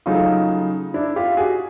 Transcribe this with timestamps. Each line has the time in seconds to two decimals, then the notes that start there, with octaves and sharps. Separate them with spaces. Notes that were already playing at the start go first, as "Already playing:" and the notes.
0.06 C#3 F#3 A3 D#4 F4
0.94 D4 E4
1.16 F4 G4
1.37 F#4 G#4